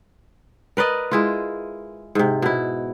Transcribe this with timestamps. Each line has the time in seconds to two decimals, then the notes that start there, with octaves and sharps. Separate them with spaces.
0.77 A#4 B4 D5 D#5
1.12 G#3 E4 F4
2.15 G#2 C3
2.42 B2 E4